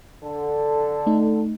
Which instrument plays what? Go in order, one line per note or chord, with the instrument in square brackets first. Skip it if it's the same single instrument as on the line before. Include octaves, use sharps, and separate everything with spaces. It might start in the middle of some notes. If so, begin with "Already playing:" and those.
[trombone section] D3 A4
[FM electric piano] A3 D#4